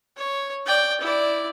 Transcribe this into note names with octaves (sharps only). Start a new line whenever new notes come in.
C#5
D5 G5
E4 D5